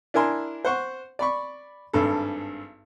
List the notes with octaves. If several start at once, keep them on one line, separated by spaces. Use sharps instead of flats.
D4 E4 A#4 G#5 C6
C5 F#5 C#6
D5 B5 C#6
G#1 G2 A4